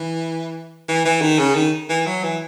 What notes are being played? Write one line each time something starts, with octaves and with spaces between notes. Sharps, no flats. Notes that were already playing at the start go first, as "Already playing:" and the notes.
Already playing: E3
E3
E3
D#3
C#3
D#3
E3
F#3
E3